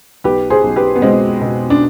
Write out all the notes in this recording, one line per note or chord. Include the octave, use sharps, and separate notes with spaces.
B1 G4 B4
G#4 C5
B1
G4 B4
B3
B2 G#3 C4
B2
D4